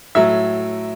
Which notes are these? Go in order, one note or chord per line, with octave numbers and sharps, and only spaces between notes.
A2 F#3 E5